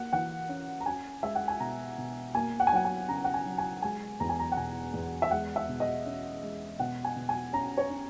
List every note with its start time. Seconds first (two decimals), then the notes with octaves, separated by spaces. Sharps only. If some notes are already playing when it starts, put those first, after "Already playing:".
Already playing: A#3 F#5
0.13 E3 F#5
0.49 C#4
0.81 A#5
0.86 C#4 G#5
1.23 G#3 E5
1.35 F#5
1.48 G#5
1.60 B2 A#5
1.98 B2
2.34 A#3 G#5
2.60 F#5
2.67 G#5
2.72 F#3 F#5
2.85 G#5
3.08 C#3 A#5
3.24 F#5
3.34 G#5
3.46 F#3
3.58 G#5
3.82 G#3 G#5
4.20 E2 A#5
4.29 G#5
4.39 A#5
4.52 F#5
4.57 B2 G#5
4.94 E2
5.22 E5
5.31 G#3 F#5
5.56 E5
5.69 B2
5.80 D#5
6.06 C#4
6.43 G#3
6.80 B2 F#5
7.04 G#5
7.16 B2
7.29 G#5
7.53 C#4 A#5
7.78 C#5
7.90 C#4